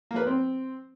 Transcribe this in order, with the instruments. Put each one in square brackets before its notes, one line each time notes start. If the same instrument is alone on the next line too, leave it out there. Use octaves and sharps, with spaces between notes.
[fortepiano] A#3
B4
B3
C4